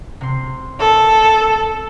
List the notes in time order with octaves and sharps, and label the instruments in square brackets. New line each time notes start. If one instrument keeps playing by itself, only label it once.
[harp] C3 C6
[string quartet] A4
[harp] A6